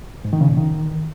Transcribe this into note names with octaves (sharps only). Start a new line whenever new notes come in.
G#2
D#3
C#3
A#2
D#3